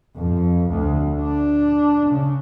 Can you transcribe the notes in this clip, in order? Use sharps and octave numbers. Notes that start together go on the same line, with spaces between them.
F2
D2
D4
C#3